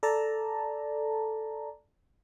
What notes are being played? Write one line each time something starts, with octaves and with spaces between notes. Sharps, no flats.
A4 D5 A5 A#5